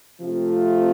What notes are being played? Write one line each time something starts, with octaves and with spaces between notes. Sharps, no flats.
C3 F3 A3 C4 F4